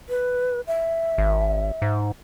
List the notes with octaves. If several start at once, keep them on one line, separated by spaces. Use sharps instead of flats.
B4
E5
G#1
G#2